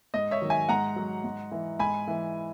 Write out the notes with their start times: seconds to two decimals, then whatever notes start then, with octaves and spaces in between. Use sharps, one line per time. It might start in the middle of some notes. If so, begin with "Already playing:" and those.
0.14 G#2 D#5
0.31 C#5 E5
0.42 D#3 F#3
0.50 E5 G#5
0.69 G#2 F#5 A#5
0.96 F#3
1.24 G#2
1.52 E3
1.79 G#2 G#5 B5
2.08 E3